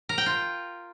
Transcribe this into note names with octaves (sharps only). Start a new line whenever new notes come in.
A#4
G5
F4